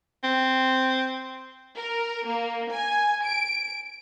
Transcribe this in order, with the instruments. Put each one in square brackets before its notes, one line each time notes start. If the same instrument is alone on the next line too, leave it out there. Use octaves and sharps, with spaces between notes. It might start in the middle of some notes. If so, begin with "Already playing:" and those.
[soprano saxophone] C4
[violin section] A#4
A#3
G#5
D7